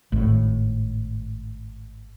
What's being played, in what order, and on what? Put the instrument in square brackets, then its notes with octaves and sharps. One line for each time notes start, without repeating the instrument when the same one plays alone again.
[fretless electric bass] G#1 A2